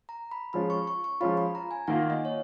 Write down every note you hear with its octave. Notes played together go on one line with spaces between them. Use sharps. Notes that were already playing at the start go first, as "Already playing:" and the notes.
A#5
B5
F3 G#3 C#4 F4 B5
C#6
C#6
C#6
F3 G#3 C#4 F4 B5
B5
A#5
G#5
D#3 A#3 F4 F#5
D#5
C#5